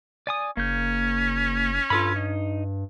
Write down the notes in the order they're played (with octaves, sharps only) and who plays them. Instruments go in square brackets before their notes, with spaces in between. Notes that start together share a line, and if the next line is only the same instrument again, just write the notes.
[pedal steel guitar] D5 G#5 D#6
[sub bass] F#1 [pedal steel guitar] A#3 G6 [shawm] C#4
[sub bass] G2 [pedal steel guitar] F4 A4 B5
[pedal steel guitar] D#4